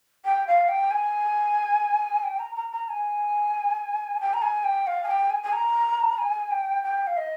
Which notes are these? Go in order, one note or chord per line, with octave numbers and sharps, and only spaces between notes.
G5
F5
G5
G#5
G5
A#5
A#5
A#5
G#5
G5
A#5
G#5
G5
F5
G#5
G5
G#5
G#5
A#5
G#5
G5
G5
F5
D#5